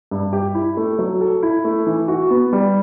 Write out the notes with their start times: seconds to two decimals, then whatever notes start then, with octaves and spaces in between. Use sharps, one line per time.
0.11 G2
0.33 G4
0.55 E4
0.77 A3
0.99 F#3
1.21 A4
1.43 E4
1.64 A3
1.87 E3
2.08 F#4
2.30 B3
2.53 G3